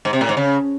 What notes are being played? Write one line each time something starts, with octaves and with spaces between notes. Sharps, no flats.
G#2
C3
A2
G#2
C#3